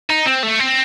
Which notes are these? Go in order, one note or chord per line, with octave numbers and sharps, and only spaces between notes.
D#4
C4
A3
C4